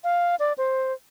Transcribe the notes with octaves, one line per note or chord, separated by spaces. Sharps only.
F5
D5
C5